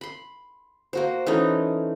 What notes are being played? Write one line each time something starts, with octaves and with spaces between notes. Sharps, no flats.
B5 C6
A#3 F#4 C5
E3 A3 C#4 D#4